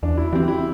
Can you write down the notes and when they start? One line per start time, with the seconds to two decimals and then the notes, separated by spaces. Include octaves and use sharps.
0.03 E2 D4
0.17 E4
0.33 E3 C4 G4
0.48 E4